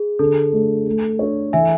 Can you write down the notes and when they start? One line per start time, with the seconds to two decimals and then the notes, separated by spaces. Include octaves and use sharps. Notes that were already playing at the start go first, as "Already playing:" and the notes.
Already playing: G#4
0.19 D3 A4
0.53 A3 D4
0.87 A3
1.19 D4 A4 C#5
1.53 E3 E5 G#5